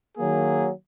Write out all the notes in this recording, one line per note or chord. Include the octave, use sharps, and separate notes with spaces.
D#3 F#3 A#3 G#4